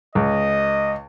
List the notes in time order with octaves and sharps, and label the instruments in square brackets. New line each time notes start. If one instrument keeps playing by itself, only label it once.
[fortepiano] C#2 [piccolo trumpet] D#5